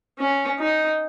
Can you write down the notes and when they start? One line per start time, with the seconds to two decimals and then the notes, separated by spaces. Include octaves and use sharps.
0.19 C#4
0.59 D#4